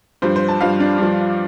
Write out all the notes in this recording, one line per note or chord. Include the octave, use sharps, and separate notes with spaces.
G2 F3 C5
C5
A5
G2 F3 F5
D4
G2 F3